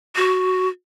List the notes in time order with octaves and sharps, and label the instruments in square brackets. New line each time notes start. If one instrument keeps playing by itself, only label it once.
[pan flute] F#4